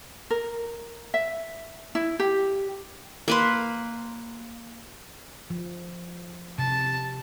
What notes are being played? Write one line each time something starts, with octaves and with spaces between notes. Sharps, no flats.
A#4
E5
E4
G4
A#3 B4 C6
F3
C3 A5